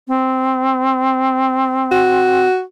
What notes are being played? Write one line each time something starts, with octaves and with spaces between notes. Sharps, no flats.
C4
F#4